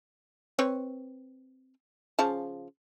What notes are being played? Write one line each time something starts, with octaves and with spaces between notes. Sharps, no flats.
C4 B4 C#5
C#3 F3 A5